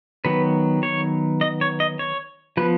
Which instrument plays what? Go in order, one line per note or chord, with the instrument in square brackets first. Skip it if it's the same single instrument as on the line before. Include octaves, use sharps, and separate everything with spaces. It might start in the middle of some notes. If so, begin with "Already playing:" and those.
[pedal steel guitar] D#3 F#3 B3 B4
C#5
D#5
C#5
D#5
C#5
F3 B3 B4